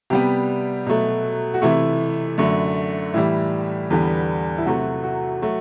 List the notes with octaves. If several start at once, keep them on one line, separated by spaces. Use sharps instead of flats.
C3 G3 B3 G4
B2 F#3 A3
F#4
C3 E3 A3 E4
F#2 D3 A3
A2 E3 G3 E4
E2 D3 G3 B3
E4
C3 F#3 A3 F#4
F#4
F#3 A3 F#4